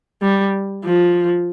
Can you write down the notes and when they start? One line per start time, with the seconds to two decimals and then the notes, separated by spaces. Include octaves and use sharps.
0.22 G3
0.84 F3